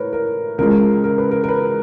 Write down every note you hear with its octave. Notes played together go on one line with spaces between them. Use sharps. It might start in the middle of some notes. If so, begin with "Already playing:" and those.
Already playing: A2 A#4 B4 C#5
A#4
C#2 C#3 F3 G#3 A#4
A#4
B4
A#4
A#4
B4